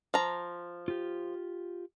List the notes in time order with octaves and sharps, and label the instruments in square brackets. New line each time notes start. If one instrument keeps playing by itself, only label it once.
[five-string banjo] F3 A#5
[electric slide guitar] F4 G4